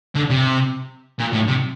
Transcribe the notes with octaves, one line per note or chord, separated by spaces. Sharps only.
D3
C3
A#2
A2
C3